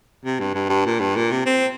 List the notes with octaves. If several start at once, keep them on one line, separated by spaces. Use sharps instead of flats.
C3
G2
G2
G2
A#2
G2
A#2
C3
C4